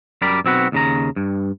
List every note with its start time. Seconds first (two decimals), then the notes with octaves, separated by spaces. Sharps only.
0.22 F#2 G3 A#4 D5 B5
0.45 B1 C4 F#4 B4
0.72 D#2 C#3 A#5
1.16 G2